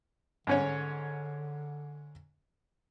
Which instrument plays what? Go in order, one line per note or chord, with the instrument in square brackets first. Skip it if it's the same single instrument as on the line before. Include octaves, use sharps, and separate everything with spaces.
[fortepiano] G#2 C#4 C#5 [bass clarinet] D3